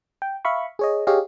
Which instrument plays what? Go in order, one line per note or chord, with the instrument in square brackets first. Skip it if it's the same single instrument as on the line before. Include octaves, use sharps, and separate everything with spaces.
[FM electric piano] G5
E5 F5 B5 C#6
G#4 C#5 D#5
G4 G#4 C#5 D#5 F5